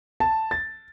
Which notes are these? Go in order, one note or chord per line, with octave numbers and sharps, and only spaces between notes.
A5
A6